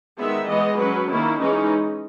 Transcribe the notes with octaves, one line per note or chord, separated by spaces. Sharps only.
D#3 G#3 B3 E5
E3 G#3 B3 D#5
F#3 C#4 B4
D#3 A#3 C#4 E4
E3 G#3 C#4 D#4